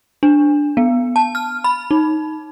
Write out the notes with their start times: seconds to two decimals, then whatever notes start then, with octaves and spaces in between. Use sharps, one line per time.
0.23 D4
0.77 B3
1.16 A5
1.35 F6
1.64 B5
1.91 D#4